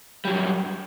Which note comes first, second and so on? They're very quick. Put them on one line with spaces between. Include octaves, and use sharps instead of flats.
G3 F#3 F#2